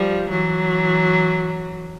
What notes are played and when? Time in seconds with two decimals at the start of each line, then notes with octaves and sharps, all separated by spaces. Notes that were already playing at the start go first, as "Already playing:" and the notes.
Already playing: F3 G3
0.29 E3 F#3